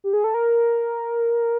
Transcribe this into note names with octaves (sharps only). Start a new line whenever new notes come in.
G4
G#4
A4
A#4